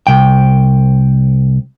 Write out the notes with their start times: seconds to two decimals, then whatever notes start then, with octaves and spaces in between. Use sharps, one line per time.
0.07 C2 G5